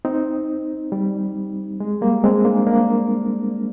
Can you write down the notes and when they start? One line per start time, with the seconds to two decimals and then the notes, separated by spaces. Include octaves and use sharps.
0.05 C4 D#4
0.92 G3
1.80 G#3
2.01 G3 A#3
2.24 G#3 C4
2.45 A#3 D4
2.67 A#3 D4